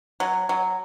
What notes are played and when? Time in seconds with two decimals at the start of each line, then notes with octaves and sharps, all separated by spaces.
0.20 F#3
0.49 F#3